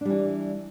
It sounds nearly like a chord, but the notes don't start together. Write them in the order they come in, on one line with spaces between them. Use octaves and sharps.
D4 G3 E3